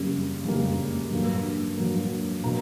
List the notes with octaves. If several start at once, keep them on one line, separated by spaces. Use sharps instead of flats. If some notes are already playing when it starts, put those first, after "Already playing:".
Already playing: F#2 C#3 G3 A#3
F#2 C#3 G3 A#3
G2 F#3 A#3
G2 F#3 A#3
B2 F#3 A#3 A#5